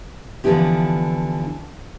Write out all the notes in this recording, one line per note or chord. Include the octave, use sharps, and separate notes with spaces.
D3 E3 F3 B3 E4 G4